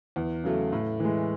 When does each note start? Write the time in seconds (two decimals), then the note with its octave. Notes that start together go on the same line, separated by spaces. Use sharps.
0.16 E2
0.44 C#3 F#3 A3
0.72 A2
1.00 E3 G#3